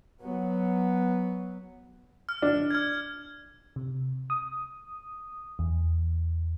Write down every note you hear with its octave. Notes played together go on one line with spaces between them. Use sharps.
F#3 B3
F6
D4
F6 G#6
C3
D#6
E2